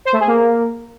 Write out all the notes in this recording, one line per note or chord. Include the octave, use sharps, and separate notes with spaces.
C5
A3
G#4
A#3